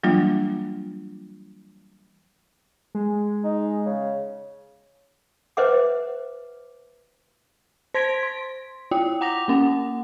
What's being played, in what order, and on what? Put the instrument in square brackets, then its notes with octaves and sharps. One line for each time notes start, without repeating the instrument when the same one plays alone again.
[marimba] E3 F#3 G3 A#3 D4 F4
[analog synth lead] G#3
[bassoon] D#4
C#3
[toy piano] B4 C5 D#5 E5 F#5 D6
[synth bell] C5 C6 G#6 A#6 B6 D7
C6
E4 F4 G5
F#5 A#5 D6 A#6 F7
A#3 C#4 F#5